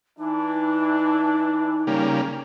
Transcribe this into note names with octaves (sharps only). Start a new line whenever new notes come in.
E3 D4 D#4
C#3 G3 A#3